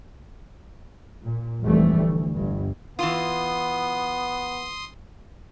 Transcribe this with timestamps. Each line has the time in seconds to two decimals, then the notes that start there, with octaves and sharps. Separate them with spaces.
1.24 A#2
1.63 F1 F2 E3 G3 A3
1.97 D2
2.34 G1 G2
2.99 E3 B3 F4 C6 D#6